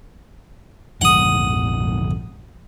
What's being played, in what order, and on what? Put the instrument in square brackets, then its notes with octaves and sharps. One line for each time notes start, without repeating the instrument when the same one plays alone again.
[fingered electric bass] A#1 F2 G#2 [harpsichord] F#5 D#6